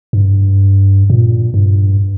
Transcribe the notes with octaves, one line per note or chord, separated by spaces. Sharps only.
G2
A#2
G2